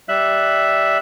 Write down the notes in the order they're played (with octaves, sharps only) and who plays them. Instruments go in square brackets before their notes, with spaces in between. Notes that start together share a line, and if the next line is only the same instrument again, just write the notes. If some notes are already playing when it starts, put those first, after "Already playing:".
[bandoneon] G3 E5 F#6